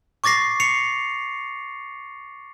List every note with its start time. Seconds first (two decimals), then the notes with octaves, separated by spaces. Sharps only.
0.24 C#6 D6 A6 A#6 C7
0.60 C7 C#7 F7